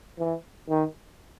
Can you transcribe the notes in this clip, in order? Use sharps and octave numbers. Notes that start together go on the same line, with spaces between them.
E3
D#3